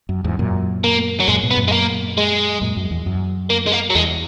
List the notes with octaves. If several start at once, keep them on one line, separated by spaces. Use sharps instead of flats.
F#2
E2 G#2
F#2 A#2
A#3
F#3
F#2 A#2 G#3
G#2 B2
B3
F#2 A#2
G#3
A#3
G#3
F#2 A#2
F#2
E2
F#2
A#3
G#3
A#3
F#3
E2 G#3